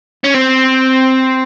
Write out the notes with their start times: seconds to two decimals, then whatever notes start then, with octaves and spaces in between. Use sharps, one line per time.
0.24 C#4
0.34 C4